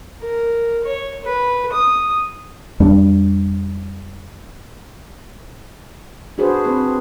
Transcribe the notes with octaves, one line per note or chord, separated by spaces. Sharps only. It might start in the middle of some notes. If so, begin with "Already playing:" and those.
A#4
C#5
B4
D#6
F2 G3 D4
D4 F#4 G#4 B4 C5
C4 B4